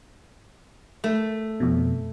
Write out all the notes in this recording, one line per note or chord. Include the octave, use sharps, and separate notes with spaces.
A3
F2 B2